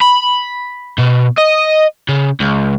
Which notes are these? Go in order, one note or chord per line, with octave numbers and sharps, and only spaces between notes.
B5
B2
D#5
C#3
C#2